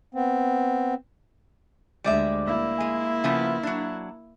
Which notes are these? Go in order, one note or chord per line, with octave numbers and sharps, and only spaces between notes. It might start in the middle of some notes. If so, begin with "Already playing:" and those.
B3 C4
D2 G3 G#3 D5 E5
A#3 E4
G#3
C#3 F3 B3
F#3 D4